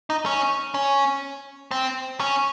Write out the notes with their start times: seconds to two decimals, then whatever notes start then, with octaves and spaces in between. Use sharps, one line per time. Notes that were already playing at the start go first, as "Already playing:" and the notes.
0.10 D#4
0.26 C#4
0.74 C#4
1.71 C4
2.20 C#4